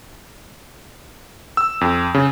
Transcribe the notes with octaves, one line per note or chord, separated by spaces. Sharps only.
E6
F2
C#3